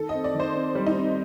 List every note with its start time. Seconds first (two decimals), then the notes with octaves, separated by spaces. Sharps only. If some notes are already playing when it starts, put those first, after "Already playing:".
Already playing: D#3 A4
0.09 C4 D#5
0.24 D5
0.35 D#3 C5
0.55 C4
0.75 G3
0.86 D#4
0.97 C4